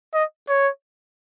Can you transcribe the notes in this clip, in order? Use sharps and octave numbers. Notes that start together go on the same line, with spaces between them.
D#5
C#5